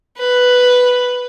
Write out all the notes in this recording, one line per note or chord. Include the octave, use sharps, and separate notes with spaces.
B4